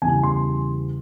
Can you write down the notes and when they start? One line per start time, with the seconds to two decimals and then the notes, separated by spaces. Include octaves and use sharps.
0.02 E2 C#3 E3 G3 G#5
0.23 C6